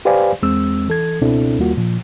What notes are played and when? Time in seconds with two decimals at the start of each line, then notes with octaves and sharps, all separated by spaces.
0.05 G4 B4 C5 D5 F5 G#5
0.42 E2 G#3 C4 E6
0.88 E3 A4 G#6
1.21 C#2 B2 C4 D4 E4 A4
1.59 D#2 G3 A#3 F4 F#4
1.77 A#2 F3